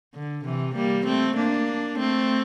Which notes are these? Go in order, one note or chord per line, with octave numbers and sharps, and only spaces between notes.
D3
C3 E3
G3 A#3
A3 C4
A#3 D4
A3 C4